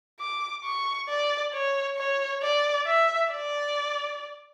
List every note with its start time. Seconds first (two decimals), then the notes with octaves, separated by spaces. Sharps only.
0.20 D6
0.65 C#6
1.09 D5
1.53 C#5
1.97 C#5
2.43 D5
2.87 E5
3.32 D5